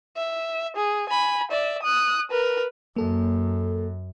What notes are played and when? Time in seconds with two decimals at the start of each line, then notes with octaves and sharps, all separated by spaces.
0.16 E5
0.76 G#4
1.09 G#5 B5
1.51 D5 E5
1.83 D#6 F#6
2.31 A#4 B4
2.96 F#2 A#3 A4